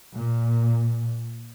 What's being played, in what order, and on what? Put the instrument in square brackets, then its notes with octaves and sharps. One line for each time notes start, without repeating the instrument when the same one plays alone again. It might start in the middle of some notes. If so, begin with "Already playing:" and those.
[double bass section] A#2